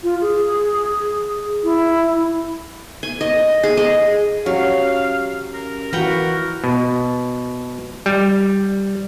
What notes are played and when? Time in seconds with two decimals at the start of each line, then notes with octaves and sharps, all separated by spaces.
0.03 F4
0.21 G#4
1.64 E4
3.03 G#5
3.21 D#5
3.63 G#4
3.77 D#5
4.46 F#3 C#4 F#4 G4 F5
5.53 A#4
5.93 E3 F4 F#4 A#4 B4 F#5 G5
6.64 B2
8.06 G3